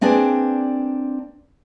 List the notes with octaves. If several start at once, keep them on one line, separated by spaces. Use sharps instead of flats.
A#3 C4 D4 G#4 B4 D5